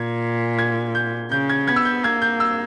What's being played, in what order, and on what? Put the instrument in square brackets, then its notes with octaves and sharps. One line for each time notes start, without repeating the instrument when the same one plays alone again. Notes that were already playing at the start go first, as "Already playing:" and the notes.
Already playing: [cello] A#2 [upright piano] G#6
[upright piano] G#6
G6
[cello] C#3 [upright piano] G6
[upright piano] G#6
[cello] B3 [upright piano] G#6
[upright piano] E6
G6
[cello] A#3 [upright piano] G#6
[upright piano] G6
E6